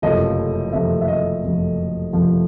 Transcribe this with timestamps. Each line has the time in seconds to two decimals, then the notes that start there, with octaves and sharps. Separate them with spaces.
0.02 F#1 F2 C3 F3 A3 D#5
0.73 F#1 F2 C3 F3 A3 E5
1.01 E5
1.08 D#5
1.43 F#1 F2 C3 F3 A3
2.12 F#1 F2 C3 F3 A3